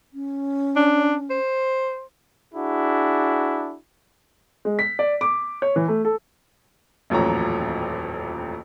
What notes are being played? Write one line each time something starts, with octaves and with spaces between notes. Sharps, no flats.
C#4
D4
C5
D4 E4 F#4 G#4
G#3
B6
D5
D6
C#5
E3
A3
A4
D#1 A1 F2 F#3 C#5 A#5